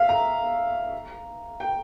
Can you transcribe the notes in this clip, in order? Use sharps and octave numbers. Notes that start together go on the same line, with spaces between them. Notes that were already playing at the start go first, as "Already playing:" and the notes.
Already playing: E5 F5
A#5
G5